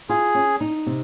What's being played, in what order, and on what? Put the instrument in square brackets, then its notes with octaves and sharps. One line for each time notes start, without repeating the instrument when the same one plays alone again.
[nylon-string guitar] F4 [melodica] G#4
[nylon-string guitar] C#4
D#4
C3